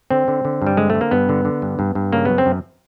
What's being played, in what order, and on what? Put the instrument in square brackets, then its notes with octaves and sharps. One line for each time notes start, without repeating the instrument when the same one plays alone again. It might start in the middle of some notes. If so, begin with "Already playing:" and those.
[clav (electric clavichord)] D3 C4
D3
D3
G2
G3
D3 G#3
A3
D3
A#3
G2 B3
D3
D3
G2
G2
G2
C#3 A#3
F#2 B3
C4
F#2